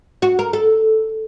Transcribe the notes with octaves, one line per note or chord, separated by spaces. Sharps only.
F#4
A#4
A4